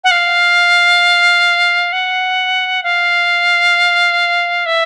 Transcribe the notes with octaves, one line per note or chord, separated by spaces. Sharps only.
F#5
F5
F#5
F5
E5